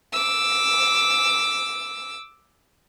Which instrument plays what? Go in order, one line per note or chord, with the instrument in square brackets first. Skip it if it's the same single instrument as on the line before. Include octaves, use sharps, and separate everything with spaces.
[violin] D6 E6